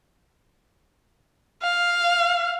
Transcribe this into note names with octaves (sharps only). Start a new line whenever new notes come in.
F5